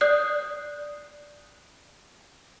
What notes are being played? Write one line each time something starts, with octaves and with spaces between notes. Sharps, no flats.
D5 D#6 F#6 G6 C7